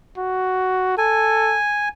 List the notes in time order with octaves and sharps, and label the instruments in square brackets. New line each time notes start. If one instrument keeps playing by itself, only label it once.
[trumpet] F#4
[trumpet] A4 [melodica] G#5